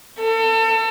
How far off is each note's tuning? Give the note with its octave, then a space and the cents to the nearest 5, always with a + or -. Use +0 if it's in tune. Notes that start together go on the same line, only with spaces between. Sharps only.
A4 +30